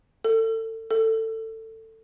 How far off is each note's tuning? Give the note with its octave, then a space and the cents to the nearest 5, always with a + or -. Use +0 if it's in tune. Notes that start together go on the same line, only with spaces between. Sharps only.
A4 +30
A4 +20